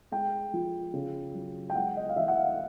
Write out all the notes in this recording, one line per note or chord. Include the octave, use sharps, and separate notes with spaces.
G#3 G5
F3
C#3
F#3
G5
G#3 F#5
D#5
F5
E3 E5
F#5
F5